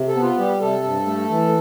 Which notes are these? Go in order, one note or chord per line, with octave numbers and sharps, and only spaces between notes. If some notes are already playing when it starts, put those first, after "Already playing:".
Already playing: C3
A4
B3
F4
G3 G4
C3 A4
G2
A3
E3